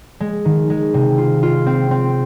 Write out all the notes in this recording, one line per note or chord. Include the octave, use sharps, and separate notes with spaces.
G#3
D#3
G#3
C3
F4
F4
C4
C4